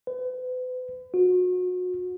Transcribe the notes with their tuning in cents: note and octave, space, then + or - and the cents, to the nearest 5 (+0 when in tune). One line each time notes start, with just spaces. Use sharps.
B4 +40
F#4 -30